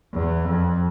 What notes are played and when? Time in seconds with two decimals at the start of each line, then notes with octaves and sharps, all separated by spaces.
0.13 E2
0.45 F2